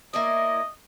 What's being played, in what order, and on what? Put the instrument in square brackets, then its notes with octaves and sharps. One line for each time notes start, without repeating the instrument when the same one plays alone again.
[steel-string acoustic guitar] A#3 E4 D5 [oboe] D#5